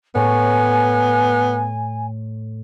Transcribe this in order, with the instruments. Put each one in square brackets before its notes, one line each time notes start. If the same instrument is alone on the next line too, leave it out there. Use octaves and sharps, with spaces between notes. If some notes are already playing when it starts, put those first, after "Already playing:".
[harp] A2 C#5 [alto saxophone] B3 [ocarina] G#5